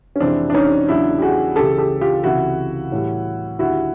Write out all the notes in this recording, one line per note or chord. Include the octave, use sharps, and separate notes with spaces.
C#4
F2 C3 E3 G#3 C4 D4
D4
C#4 D#4
E2 C#3 F#3 D4 E4
G4
F#4 G#4
C#2 C#3 E3 G#3 G4 A4
G4 A4
F4 G4
C#2 C3 E3 E4 F#4
A2 E3 G3
D#2 D3 G3 E4 F#4